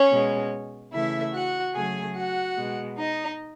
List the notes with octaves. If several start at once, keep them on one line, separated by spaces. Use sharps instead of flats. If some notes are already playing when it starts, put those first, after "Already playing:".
Already playing: C#4 C#5
B2 G#3
C#3 E3 A3 E4 E5
F#4 F#5
C#3 F#3 A3 G#4 G#5
F#4 F#5
B2 G#3
D#4 D#5